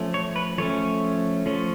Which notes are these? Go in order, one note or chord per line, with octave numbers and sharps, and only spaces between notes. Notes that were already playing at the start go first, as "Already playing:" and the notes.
Already playing: F3 A3 C#4
C#5
B4
F3 A3 C#4 C#5
F3 A3 C#4